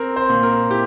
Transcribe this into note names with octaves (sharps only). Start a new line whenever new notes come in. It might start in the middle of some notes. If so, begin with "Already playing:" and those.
Already playing: C4 A#4
C5
A#2
A#4
E4 G4